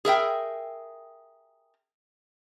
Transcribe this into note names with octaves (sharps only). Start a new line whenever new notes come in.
G#4 A#4 E5 G5